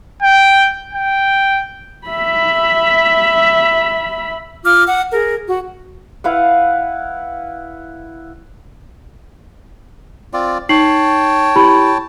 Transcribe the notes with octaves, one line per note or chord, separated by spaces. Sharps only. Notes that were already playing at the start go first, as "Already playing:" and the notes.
G5
G5
E5 B5
F4 D6 F6
F#5
G#4 A#4
F#4
E4 B4 F5 F#5
C4 F4 D5
D#4 C#5 G5 A5 C7 F#7
E4 G4 B5